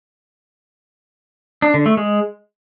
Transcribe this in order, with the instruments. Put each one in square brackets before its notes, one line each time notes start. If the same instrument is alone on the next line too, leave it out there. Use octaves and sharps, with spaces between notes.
[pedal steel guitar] D4
D3
A3
G#3